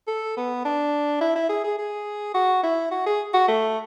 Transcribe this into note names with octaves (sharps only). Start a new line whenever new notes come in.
A4
B3
D4
E4
E4
G#4
G#4
G#4
F#4
E4
F#4
G#4
F#4
A3